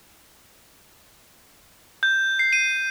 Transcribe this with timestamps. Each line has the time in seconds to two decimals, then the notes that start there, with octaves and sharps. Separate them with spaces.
2.03 G6
2.39 C7
2.53 D#7